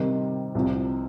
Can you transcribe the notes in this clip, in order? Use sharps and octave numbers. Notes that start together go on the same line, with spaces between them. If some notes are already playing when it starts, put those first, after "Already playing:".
Already playing: C3 D#3 G3 C4
C2 C3 F3